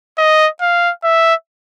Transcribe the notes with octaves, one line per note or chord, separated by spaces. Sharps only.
D#5
F5
E5